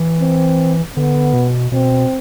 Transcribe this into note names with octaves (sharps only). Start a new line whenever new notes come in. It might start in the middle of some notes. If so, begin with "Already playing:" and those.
Already playing: E3
C4
D3 B3
B2
B2 C4